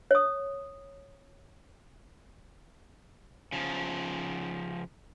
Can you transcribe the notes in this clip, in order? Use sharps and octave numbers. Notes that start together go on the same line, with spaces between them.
C#5 D#6
C#3 F3